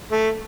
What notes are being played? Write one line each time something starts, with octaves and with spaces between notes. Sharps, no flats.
A3